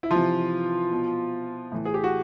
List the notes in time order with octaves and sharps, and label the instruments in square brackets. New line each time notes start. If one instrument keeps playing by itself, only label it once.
[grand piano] E4
C3 E3 F3 F4
B2
A2 E3
G#4
G4
F#4